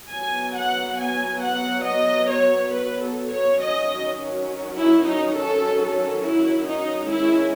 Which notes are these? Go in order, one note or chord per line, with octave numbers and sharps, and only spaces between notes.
F#3 B3 G#5
F#5
G#5
F#5
D#5
C#5
B4
A4
C#5
D#3 F#3 C#4 D#5
E4
D#4
A4
A4
E4
D#4
D#3 G#3 C#4 E4